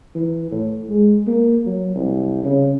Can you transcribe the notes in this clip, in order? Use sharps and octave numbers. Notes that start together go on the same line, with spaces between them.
E3
A2
G#3
A#3
F#3
C2
C#3